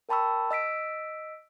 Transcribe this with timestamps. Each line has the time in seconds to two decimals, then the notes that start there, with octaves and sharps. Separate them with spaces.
0.09 A#4 G5 A5 B5 C#6 E6
0.51 D#5 E6 B6 D7